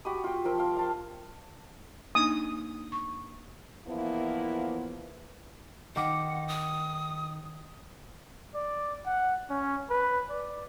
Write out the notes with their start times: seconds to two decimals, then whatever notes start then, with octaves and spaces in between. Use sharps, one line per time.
0.05 F#4 G4 B5 D#6
0.24 F4 G5
0.45 F3 A#4 E6
0.58 F5 C6
0.77 F5 A5 C6
2.15 A#3 D4 D#4 D#6
2.92 C#6
3.87 E2 F3 A#3 B3 E4
5.96 D#3 F#5 D6
6.48 D#6
8.54 D5
9.06 F#5
9.50 C#4
9.90 B4
10.30 D5